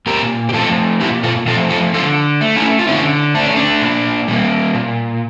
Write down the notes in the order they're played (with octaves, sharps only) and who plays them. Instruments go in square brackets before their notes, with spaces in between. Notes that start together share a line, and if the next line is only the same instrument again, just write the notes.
[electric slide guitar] A#2 G4 A#4
G4
F3 A3 F4 A4
A#2 E4 G4
F4 A4
F3 F4 A4
A3
F4 A4
D3 F4 A4
A3
C#4 E4
F4
D3 C#4 E4
A3 D4
C#4
D4
A#2
G3 A#3
A#2